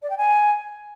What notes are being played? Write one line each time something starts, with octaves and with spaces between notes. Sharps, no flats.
D5
G5
G#5